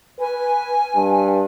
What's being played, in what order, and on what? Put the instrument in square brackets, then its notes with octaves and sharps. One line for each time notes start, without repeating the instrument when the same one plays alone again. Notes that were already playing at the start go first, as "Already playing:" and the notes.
[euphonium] B4 [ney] G#5
[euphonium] G2